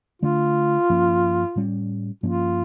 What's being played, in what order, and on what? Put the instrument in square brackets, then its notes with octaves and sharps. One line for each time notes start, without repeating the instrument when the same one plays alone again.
[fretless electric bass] D3 A3 D4 [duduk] F4
[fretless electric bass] G2 F3 A#3 C#4
A2 G3 C#4
[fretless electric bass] G2 F3 A#3 C#4 [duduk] F4